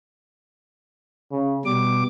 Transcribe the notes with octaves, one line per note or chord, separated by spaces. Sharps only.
C#3
B2 G3 D6